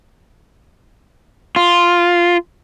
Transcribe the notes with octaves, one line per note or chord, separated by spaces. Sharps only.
F4